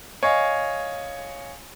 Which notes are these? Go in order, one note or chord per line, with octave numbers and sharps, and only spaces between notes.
C#5 D#5 F5 G#5